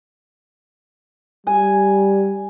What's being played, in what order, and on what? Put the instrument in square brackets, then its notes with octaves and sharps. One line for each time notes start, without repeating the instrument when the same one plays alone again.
[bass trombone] G3 [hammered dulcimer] G#5